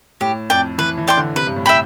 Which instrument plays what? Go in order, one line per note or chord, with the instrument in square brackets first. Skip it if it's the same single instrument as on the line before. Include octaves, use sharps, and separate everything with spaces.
[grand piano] A2 [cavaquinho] G4
[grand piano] F2 [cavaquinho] D5 G5
[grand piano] E3 [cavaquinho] B4
[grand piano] E3
[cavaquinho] D5 G5 C6
[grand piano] D3
[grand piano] C3 [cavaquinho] B4
[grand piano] G2
A2
[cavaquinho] E5 G5 B5